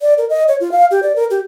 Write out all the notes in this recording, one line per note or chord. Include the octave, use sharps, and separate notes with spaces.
D5
A#4
D#5
C#5
F4
F5
G4
D5
A#4
G4